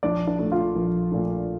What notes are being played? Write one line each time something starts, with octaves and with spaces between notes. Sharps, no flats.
A#1 D4 D5
D4 D5
A#2 A3 D4
F4 F5
A#1
A#2 A3 D4